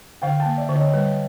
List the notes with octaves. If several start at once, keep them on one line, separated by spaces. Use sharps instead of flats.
D3 F5 G5
G5 A5
A#3
D5 E5
D3
C#5 D#5
G3 B4